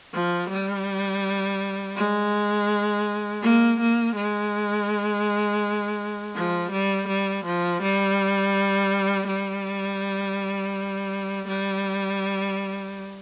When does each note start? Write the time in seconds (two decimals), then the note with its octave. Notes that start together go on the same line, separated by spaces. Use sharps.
0.14 F3
0.49 G3
1.97 G#3
3.42 A#3
3.80 A#3
4.15 G#3
6.35 F3
6.71 G3
7.08 G3
7.45 F3
7.82 G3
9.27 G3
11.48 G3